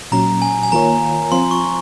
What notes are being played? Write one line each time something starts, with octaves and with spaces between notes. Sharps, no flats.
A#2 F#3 C#4 A#5
G#5
G#5
D#3 A#3 F4 A#4 C#5 A#5
F3 C4 F4 C6
C#6